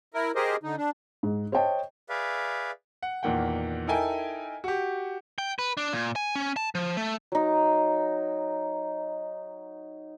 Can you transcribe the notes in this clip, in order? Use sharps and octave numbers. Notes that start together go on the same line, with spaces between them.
E4 A#4
G4 G#4 A#4 C5 D#5
D3 D#4
D4
G#2
C5 C#5 D#5 G5 A5
G#4 B4 D5 E5 F5
F#5
E2 A#2 D#3 F#5 G5
D#4 E4 A4 A#4 G5 G#5
F#4 G4
G5
B4
D4
A#2
G#5
C#4
A5
F3
A3
F#3 D#4